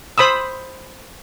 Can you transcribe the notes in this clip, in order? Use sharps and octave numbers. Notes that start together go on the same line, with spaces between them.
C5 B5 D#6 E6